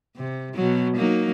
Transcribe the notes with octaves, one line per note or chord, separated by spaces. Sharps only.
C3
B2 F#3
F#3 A#3 D#4